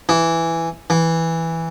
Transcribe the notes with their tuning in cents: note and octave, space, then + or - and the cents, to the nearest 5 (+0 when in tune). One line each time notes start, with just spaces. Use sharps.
E3 +5
E3 -5